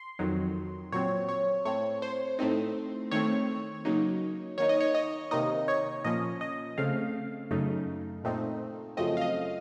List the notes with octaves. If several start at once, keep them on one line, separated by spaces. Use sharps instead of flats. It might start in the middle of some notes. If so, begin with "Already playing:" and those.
Already playing: C6
F2 D#3 F#3
A#2 F#3 C4 C#5
C#5
A2 A3 C4 C#5
C5
A2 A3 C4 D#4
D#3 A3 C4 C#5
C#3 F#3 A#3 D#4
D#3 A#3 D#4 C#5
D#5
C#5
D#5
C3 D#3 A#3 D#4 D#5
C#5
A#2 F3 A#3 C#4 D#5
D#5
C#3 A3 C4 F5
F#2 C#3 A3 D#4
A#2 A3 C4 D#4
F#2 C#3 F3 A3 C4 D#5
F5
D#5